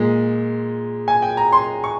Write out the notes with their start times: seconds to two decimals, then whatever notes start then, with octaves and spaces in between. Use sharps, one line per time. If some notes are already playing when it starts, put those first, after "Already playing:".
Already playing: A#2 G#3
1.08 G#5
1.22 G5
1.37 A#5
1.53 C6
1.84 C#6